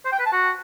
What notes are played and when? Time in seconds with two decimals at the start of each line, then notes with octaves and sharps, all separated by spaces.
0.05 C5
0.12 G5
0.19 B4
0.26 A5
0.33 F#4